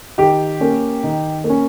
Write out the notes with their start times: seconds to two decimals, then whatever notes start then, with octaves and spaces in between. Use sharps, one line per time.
0.18 D#3 G4 G5
0.60 A#3 C#4
1.03 D#3
1.44 A#3
1.50 C#4